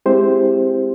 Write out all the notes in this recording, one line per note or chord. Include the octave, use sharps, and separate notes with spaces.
G#3 C4 E4 G4 C5